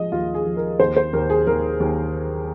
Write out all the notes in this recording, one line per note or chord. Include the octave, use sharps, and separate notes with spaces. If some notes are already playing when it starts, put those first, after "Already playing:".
Already playing: F3 G#3 D#5
D#2 F4
G#4
F3
A#4
D#2 C5
C5
D#2 A#4
G#4
D#2 A#4
D#2